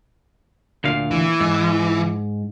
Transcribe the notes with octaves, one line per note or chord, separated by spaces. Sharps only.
D2 A#2 F5
E3
G#2